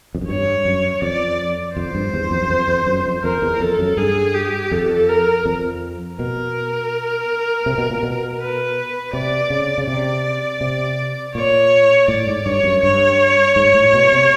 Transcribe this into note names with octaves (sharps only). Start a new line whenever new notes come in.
F2
F#2
G2 C#5
F#2
F2 D5
F2 C5
G2
E2
F2
F#2
F2
F2
F#2
F2
F2 A#4
E2
F2 A4
F#2
G2 G#4
G4
F2 A4
A#4
F2
B2 A#4
C3
B2
A#2
B2
B4
C3 D5
C#3
C#3
C3 D5
C3
A#2 C#5
A2 D5
G#2
G2 C#5
F#2
G2 C#5
G#2
A2
B2
C3